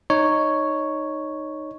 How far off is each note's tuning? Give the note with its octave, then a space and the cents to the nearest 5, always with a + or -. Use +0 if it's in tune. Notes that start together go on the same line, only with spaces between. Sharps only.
D#4 -10 C#5 +0